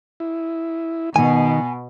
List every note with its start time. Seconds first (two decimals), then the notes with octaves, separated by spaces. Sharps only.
0.20 E4
1.16 B2 D#3 G#5